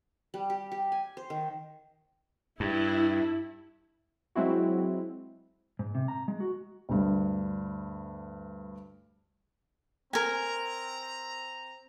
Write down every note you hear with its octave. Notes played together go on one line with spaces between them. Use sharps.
G3
G4
G4
G#5
C5
D#3
G2 E4
F#3 G#3 C4 E4 F#4
G#2
C3
A#5
G#3
F#4
D2 G2
C4 A#4 G#5 A#5